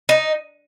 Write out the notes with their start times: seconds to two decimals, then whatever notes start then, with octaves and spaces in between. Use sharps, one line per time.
0.09 D#4